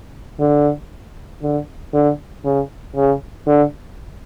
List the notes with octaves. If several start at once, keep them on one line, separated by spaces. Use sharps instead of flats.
D3
D3
D3
C#3
C#3
D3